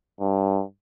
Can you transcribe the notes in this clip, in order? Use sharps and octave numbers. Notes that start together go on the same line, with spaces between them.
G2